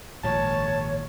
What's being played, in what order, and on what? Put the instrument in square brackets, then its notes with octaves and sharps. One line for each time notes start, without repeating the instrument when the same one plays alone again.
[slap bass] G#1 A#2 F3 [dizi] C#5 [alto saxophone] A5